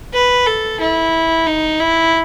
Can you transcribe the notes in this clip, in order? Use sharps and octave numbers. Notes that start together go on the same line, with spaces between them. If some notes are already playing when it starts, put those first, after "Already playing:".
B4
A4
E4
D#4
E4